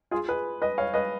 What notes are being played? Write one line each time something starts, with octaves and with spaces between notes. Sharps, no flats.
F4 G#4
G#4 B4
B4 D#5
C#5 F5
B4 D#5